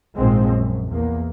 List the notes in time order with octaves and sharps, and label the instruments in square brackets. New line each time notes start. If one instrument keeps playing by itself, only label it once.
[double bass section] A#1 G#2 F3 G#3 C4
F#2
E2 A#3